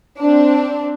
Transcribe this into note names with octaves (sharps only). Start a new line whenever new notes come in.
C4 D4